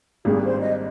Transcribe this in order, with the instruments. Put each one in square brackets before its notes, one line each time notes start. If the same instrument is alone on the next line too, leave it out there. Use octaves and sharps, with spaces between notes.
[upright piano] G#1 G#2 G3 A#3 D4 [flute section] G#4
[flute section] C5
D#5